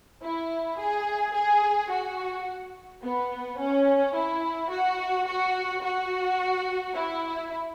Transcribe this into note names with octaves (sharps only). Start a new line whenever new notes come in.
E4
G#4
G#4
F#4
B3
C#4
E4
F#4
F#4
F#4
E4